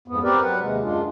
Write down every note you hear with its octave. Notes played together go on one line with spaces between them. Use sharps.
F2 G#2 B3
C4 G4 A#4 B4 D5
F#3 B4 F#5
D#2 C3 G#3
F#2 G#3 D4 F4